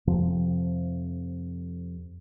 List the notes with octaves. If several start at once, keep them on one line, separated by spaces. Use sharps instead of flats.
F2 C3 F3 C4